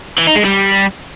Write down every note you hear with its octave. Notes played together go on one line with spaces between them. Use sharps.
E3
D#4
G#3
G3